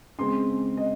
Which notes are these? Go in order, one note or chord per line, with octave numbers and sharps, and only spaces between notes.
C#3 G#3 C4 C6
D#5